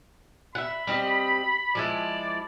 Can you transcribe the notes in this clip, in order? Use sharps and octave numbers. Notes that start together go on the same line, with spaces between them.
E5 F#5 B5
G3 C4 D#5
F3 G#3 E4 D5